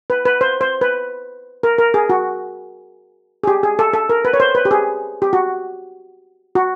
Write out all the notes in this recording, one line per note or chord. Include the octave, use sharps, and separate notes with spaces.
B4
B4
C5
C5
B4
A#4
A#4
G#4
F#4
G#4
G4
G#4
A4
A4
A#4
B4
C#5
C5
B4
G4
G#4
G4
F#4
F#4